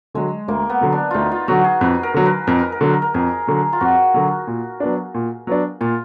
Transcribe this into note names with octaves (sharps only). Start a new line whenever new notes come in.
D3 F#3 G#3
D2 A#3
B3
D3 F#3
D4
D2 D#4 F4
F4
D3 F#3 F#4
G#4
F2 B4
A#4
D3 F#3
B4
F2 A#4
B4
A#4
D3 F#3
A#4
F2 G#4
D3 F#3
F4
F2 F#4
D3 F#3
A#2
F#3 B3 D4
A#2
F#3 B3 D4
A#2 F4